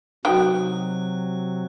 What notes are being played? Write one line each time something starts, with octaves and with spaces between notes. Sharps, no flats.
C3 F#3 D#4 F#4 G5 D#6 F#6